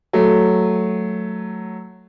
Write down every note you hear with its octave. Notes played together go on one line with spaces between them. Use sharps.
F#3 A3